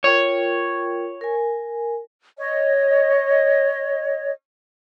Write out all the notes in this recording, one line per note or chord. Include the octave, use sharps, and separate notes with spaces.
F4 A#4 C#5 G5
A#4 G#5
C#5 D#5